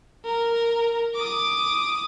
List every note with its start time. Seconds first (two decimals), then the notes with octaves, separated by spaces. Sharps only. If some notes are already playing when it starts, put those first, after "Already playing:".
0.25 A#4
1.15 D6 D#6